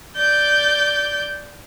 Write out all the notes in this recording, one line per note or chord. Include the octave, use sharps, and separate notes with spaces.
D5 G6